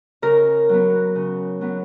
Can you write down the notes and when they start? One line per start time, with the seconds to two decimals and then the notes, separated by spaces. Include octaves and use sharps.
0.22 C#3 A#4
0.69 F#3 B3
1.15 C#3
1.61 F#3 B3